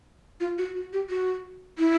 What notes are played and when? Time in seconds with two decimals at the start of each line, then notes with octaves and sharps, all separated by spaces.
0.40 F4
0.58 F#4
0.75 F#4
0.93 G4
1.10 F#4
1.78 E4